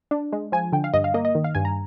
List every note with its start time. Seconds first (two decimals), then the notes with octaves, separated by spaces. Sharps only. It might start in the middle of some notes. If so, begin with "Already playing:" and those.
0.11 D4
0.32 G#3
0.52 F3 G#5
0.72 D3 G5
0.84 F5
0.94 G2 D#5
1.04 F5
1.14 A#3 D#5
1.25 D#5
1.35 D#3
1.44 F5
1.55 G2 G#5
1.65 A#5